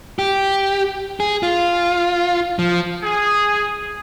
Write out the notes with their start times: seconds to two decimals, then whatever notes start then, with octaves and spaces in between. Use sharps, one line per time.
0.19 G4
1.20 G#4
1.43 F4
2.59 F3
3.03 G#4